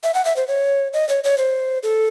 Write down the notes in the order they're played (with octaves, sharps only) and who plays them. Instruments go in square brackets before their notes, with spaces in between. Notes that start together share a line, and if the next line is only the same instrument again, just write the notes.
[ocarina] E5
F#5
E5
C5
C#5
D#5
C#5
C#5
C5
A4